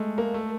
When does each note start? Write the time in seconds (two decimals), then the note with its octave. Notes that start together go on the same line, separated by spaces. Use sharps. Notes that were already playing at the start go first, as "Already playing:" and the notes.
Already playing: G#3 A3
0.18 A#3
0.34 A3